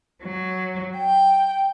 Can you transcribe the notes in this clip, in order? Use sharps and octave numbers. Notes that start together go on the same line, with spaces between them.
F#3
G5